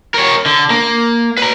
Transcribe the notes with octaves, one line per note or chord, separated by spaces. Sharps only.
A#4 C#5
D3
A#3
B4 A#5